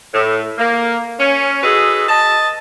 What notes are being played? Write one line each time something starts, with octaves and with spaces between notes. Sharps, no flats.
A2
A#3
C#4
D#4 F#4 G#4 A4 B4
D#5 A5